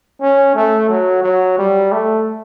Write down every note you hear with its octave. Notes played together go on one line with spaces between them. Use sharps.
C#4
A3
F#3
F#3
G3
A3